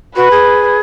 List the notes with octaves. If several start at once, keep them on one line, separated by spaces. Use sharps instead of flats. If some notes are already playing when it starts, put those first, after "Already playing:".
F#4 B4
G#4